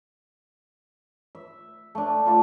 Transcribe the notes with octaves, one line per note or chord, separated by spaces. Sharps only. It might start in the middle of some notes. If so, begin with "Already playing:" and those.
E5
A3 D4
F4 D5